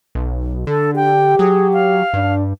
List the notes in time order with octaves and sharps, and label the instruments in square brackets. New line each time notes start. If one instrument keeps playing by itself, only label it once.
[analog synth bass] B1
[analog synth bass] D3 [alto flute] A4
[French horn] G4 [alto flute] G5
[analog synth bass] F#3 [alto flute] G#4
[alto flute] F5
[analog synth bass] G2 [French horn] D4